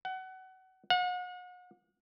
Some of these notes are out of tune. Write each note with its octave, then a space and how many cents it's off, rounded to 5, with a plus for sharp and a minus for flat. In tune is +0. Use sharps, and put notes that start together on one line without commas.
F#5 +25
F#5 -40